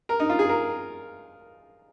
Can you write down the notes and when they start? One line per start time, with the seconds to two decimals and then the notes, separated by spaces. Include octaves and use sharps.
0.09 A#4
0.20 D#4
0.29 F4
0.39 G#4
0.49 A#4